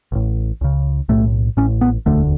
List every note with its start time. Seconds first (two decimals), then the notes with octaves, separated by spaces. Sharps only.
0.12 A1 A2
0.61 C#2 C#3
1.09 B1 A2 A3
1.57 A1 A2 C#4
1.81 B3
2.06 E1 D2 D3 A3